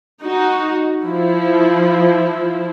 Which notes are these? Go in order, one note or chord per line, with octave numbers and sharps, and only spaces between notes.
D#4 F#4
F3 E4